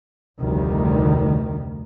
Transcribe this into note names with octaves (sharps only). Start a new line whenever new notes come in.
F1 D2 D#3 G3